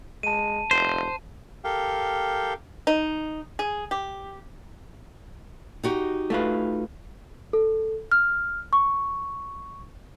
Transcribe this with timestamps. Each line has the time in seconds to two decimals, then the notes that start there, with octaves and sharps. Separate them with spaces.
0.23 G#3 A5 D#7
0.71 F1 C5
1.64 G4 A4 A#4 F5 G5
2.87 D#4
3.59 G#4
3.91 G4
5.83 D#4 F#4 G4
6.30 A3 F4 B4
7.53 A4
8.12 F6
8.73 C#6